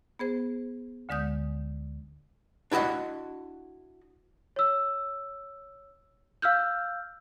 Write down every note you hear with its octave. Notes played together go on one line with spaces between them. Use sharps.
B3 G#4 C5
D2 D3 G#3 D#6 G6
D4 E4 F#4 D#5 F#5
C#5 E6
F5 E6 F6 G6